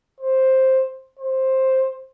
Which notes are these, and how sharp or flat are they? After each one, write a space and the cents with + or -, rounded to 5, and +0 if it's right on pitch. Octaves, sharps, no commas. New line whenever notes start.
C5 +5
C5 +10